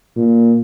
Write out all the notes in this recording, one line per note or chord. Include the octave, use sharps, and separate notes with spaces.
A#2